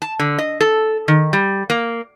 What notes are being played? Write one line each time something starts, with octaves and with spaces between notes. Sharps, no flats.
A5
D3
D#5
A4
D#3
G3
A#3